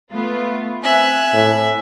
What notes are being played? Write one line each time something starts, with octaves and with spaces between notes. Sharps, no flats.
A3 B3 F4
C4 E5 G#5 F#6
A2